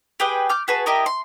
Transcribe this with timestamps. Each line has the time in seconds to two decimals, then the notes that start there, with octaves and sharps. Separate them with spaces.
0.20 G4 G#4 B4 G5
0.49 D6 F6 G6
0.68 F#4 G#4 B4 A5
0.86 E4 G4 A#4 D#5
1.06 C6